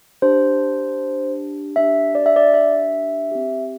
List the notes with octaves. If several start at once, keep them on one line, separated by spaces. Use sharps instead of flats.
D4 G4 C5
D4 G4 E5
D5
E5
D5
E5
C4 G4